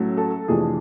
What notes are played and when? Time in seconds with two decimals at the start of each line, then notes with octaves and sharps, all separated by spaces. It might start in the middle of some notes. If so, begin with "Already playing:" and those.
Already playing: A2 F#3 A3 C#4
0.17 A4
0.48 F2 C3 E3 A3 D4 G#4